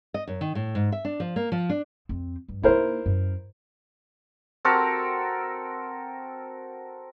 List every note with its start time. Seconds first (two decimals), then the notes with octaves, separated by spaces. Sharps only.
0.14 D#5
0.27 F#2
0.41 D#3
0.55 A2
0.75 G#2
0.92 E5
1.05 D4
1.20 F3
1.36 A#3
1.52 F3
1.70 D4
2.09 F2 C4
2.48 G2
2.63 A#3 D#4 E4 A#4 C5
3.06 F#2
4.65 C4 F#4 A4 A#4